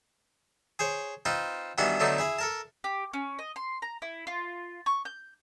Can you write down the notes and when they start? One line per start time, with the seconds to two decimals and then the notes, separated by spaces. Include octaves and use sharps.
0.79 G#4 C5 C#5
1.25 C4 D#4 F4 B4
1.78 G2 D#3 E3 B3 F#4 F#5
2.00 D3 F#3 A3 B3 D#4 D5
2.18 E4 G#4 B5
2.39 A4 A#4 A5
2.84 G4
3.13 C#4
3.39 D#5
3.56 C6
3.82 A#5
4.02 E4
4.27 F4
4.86 C#6
5.05 G6